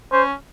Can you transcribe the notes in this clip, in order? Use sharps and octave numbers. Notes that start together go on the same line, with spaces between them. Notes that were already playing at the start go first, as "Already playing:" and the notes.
C#4 C5